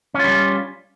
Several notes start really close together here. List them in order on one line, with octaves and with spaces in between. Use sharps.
C#4 F4 G3